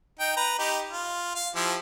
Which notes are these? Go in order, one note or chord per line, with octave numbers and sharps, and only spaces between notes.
D#4 G5
B4 A#5
D#4 G4
F4
F5
F3 E4 G4